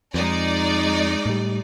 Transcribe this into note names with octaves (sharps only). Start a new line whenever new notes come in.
F2 G#3 D#4 D5
A2 G3